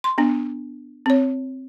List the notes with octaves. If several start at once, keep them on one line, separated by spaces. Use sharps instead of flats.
C6
B3 D4
C4 C#5